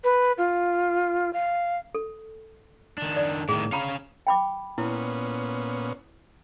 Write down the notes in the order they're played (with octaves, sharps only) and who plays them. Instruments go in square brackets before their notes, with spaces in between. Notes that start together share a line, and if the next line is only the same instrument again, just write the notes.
[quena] B4
F4
F5
[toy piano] A4
[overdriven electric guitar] D#3 D4
[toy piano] D5
[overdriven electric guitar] A2 D#3 [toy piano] G#4
[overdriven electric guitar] C#4 F5 [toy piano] G5 A#5 B5
[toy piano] G5 B5 D6
[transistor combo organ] A#2 B3 C#4 [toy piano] E4